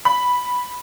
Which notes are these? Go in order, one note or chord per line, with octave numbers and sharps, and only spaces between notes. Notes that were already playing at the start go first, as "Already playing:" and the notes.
B5